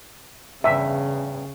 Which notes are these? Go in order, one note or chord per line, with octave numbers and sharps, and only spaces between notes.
E2 G2 C#3 E5